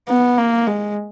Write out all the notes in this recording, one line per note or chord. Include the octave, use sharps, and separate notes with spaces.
B3
A#3
G#3